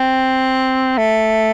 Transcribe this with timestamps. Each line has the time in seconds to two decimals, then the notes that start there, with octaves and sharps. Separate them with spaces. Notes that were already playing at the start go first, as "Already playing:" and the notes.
Already playing: C4
0.98 A3